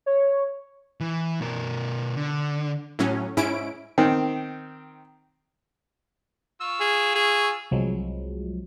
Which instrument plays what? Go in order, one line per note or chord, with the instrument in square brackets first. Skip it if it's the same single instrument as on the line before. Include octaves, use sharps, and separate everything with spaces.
[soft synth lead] C#5
[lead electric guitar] E3
B2 A#4
D3
[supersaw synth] A2 F#3 C#4
G#2 C#4 E4 D7
[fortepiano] D#3 C4
[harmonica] F4 C#6 E6
[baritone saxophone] G#4
G#4
[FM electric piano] C2 F3 F#3 G#3